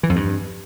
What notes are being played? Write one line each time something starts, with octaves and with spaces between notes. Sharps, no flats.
E3
F2
G2